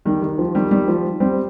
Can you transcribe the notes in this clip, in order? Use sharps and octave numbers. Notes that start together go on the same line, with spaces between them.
D#3 G3
D#3
F3
D#3 G3
D#3 G3
F3
G3 C4